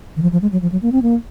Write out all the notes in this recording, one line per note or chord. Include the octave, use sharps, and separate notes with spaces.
D#3
F3
F3
G#3
F#3
F3
F#3
A#3
C4
A#3